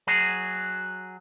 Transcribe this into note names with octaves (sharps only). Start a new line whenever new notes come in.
F#3 F#4 G#4